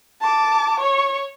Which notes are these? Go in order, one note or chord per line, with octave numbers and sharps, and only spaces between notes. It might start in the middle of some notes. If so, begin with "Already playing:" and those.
A5 D6
C#5 C#6